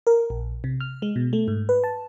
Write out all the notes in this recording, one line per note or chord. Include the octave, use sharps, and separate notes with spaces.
A#4
A#1
C3
F6
G#3
B2
A3
G#2
B4
A5